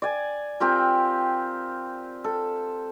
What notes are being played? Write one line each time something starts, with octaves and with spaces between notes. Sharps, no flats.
D5 G#5
C4 F4 G4 A#4
A4